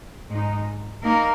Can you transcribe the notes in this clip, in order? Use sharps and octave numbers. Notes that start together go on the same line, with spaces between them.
G#2 G#3 D#4
A#3 D#4 A#4